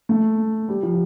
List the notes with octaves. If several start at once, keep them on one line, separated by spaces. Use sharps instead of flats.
A3
G3
F3